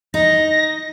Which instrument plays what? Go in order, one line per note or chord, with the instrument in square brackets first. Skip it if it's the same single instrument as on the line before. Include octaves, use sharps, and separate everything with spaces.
[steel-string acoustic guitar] D#4 [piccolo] A#6